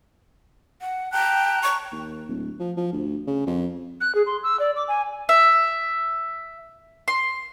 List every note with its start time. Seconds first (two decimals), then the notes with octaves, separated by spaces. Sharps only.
0.81 F#5
1.12 G5 A5 A#5 F#6
1.63 C#6
1.92 D#2
2.28 D1
2.60 F3
2.77 F3
2.93 D2
3.27 C#3
3.47 F2
4.01 F#6
4.15 G#4
4.26 C6
4.43 E6
4.60 D5
4.76 D6
4.88 G#5
5.29 E5
7.08 C6